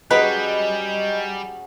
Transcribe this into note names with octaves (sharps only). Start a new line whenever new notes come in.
F#3 G3 C#4 G#4 B4 D#5